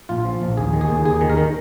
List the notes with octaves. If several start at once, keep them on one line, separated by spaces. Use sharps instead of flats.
A#1 F4
F3
A#1
D#2 G#4
D#3
G#4
D#2
D#2 G#4
D#3
A#4
D#3